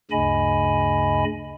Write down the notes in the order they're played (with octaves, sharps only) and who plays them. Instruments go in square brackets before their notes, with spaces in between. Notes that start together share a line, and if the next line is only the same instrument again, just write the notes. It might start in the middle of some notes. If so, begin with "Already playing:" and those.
[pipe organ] D2 G2 C#3 D#5 G#5 B5